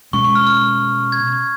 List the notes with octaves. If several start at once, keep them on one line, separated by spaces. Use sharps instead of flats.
B2 G#3 C#4 C#6
C#6
F6
F6
G#6